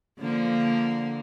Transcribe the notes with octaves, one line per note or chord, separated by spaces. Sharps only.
D3 F3 A#3